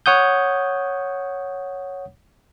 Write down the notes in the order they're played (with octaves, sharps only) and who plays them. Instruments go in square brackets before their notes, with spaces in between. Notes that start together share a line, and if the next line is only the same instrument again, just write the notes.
[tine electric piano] C#5 F#5 D#6 G6